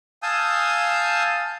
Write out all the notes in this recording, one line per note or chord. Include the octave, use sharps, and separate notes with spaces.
F5 G#5 A5 D#6 E6 G6